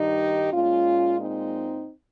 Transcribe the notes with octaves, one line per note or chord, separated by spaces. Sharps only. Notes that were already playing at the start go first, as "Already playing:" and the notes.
Already playing: G2 D#3 G3 D#4 G4
A#2 G#3 C#4 F4
C4 D#4